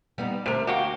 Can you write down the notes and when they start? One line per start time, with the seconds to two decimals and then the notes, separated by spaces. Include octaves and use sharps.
0.18 G3 B3 D#4
0.46 D2 C3 A#4
0.67 A#3 F#4 G4